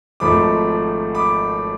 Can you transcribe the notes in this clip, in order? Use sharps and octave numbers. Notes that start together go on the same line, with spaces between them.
G#1 G#2 F3 A3 B5 D6
B5 D6